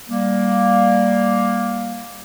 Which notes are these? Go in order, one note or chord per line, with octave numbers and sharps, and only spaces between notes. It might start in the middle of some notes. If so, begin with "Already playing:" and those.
G3 A#3